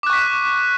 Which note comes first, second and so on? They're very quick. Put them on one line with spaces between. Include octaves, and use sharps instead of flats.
D6 F#6 C#6 B6